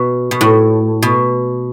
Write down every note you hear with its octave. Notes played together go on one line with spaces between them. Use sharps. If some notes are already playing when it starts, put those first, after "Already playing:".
Already playing: B2
B2
A2
B2